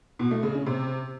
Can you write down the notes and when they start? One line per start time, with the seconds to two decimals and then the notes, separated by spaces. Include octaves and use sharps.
0.19 B2
0.31 A3
0.43 C#3
0.55 C#4
0.66 C3